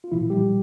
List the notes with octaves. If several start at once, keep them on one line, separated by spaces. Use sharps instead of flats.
F4
C2 A#2 E3 F3 E4
G3 G4